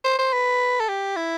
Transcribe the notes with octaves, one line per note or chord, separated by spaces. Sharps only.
C5
C5
B4
A4
G4
E4